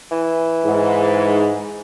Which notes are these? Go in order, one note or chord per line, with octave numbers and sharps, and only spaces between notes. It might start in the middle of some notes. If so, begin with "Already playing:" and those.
E3
G#2